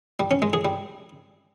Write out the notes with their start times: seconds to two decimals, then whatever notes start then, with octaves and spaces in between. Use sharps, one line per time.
0.20 G3
0.31 C#4
0.42 G#3
0.53 G#4
0.65 G3